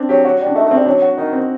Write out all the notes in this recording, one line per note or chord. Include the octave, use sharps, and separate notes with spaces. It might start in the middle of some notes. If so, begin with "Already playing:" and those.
Already playing: C4 D4
F#3 G4
F#3 F#4
G3
D4
A3 D#4
A3
C4
G3
F#3 D4
F#4
D#3 D#4
C4